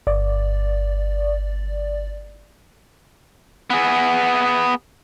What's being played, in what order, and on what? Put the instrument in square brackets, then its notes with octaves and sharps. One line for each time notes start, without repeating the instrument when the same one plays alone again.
[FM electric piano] G1 D5
[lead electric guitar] B3 G#4